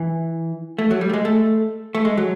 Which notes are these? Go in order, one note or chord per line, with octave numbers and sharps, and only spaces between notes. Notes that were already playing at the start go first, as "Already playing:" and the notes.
Already playing: E3
A3
F#3
G3
A3
G#3
A3
A3
G#3
F#3